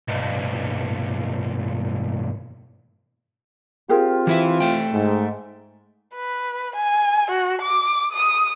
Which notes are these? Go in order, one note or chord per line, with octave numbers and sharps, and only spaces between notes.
B1 G2
C4 F4 G4 G#4 A#4
E3 E4 E5
A3 G5
G#2
B4
G#5
F#4
D6
D#6